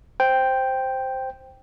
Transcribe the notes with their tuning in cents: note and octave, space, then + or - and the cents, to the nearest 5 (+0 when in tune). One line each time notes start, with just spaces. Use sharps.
C5 +0 G5 +0